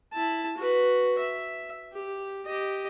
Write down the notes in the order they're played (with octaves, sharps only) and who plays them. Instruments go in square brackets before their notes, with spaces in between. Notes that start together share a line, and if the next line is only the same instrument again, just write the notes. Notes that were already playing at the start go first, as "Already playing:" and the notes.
[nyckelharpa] E4 A5
F#4 B4
E5
G4
G4 D#5